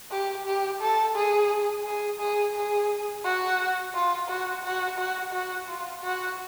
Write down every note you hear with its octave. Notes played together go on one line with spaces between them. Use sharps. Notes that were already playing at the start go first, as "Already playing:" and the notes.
G4
G4
A4
G#4
G#4
G#4
G#4
F#4
F4
F#4
F#4
F#4
F#4
F4
F#4